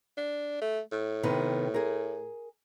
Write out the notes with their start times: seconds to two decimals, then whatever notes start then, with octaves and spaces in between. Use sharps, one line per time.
0.17 D4
0.61 A3
0.92 A2
1.23 C3 D#3 B3
1.74 G#4 A#4